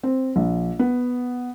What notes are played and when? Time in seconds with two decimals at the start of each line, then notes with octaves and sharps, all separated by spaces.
0.03 C4
0.36 A#1
0.79 B3